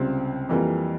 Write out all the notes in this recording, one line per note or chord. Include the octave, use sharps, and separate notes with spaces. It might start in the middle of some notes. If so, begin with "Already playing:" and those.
Already playing: C#2 C3 G3 C4
F2 E3 G3 A#3